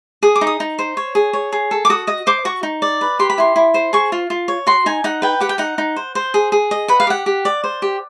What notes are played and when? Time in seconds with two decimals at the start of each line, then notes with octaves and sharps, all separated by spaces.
0.23 G#4 D#6
0.36 D6
0.41 D#4
0.47 D#6
0.60 D#4
0.79 C5
0.97 C#5
1.15 G#4
1.33 C#5
1.52 G#4
1.71 A4
1.85 D6
1.90 F#4 D#6
2.07 D#5 D#6
2.27 C5 D6
2.45 F#4 C#6
2.63 D#4
2.82 D5
3.01 B4
3.19 G4 C6
3.30 B5
3.38 E4 C6
3.56 E4
3.74 C5
3.93 G#4 C#6
4.12 F4
4.30 F4
4.48 C#5
4.67 F#4 C6
4.86 D#4 G#5
5.04 D#4 F#5
5.22 B4 G5
5.40 G4 F#5
5.49 G5
5.58 D#4 F#5
5.78 D#4
5.96 C5
6.15 C5
6.34 G#4
6.52 G#4
6.71 D#5
6.88 B4 F#5
7.00 F5
7.07 G4 F#5
7.26 G4
7.45 D5
7.64 C5
7.82 G4